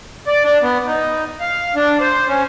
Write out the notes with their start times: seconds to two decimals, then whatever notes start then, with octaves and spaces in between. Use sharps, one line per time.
0.27 D5
0.44 D4
0.62 B3
0.87 D#4
1.40 F5
1.76 D4
2.00 C5
2.28 C#4